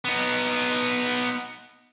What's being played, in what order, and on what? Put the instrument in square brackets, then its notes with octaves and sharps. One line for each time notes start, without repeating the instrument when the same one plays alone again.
[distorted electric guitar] B3 D#4